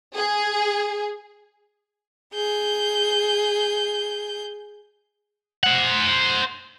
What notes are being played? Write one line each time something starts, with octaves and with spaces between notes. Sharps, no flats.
G#4
G#4 G6
C5 F#5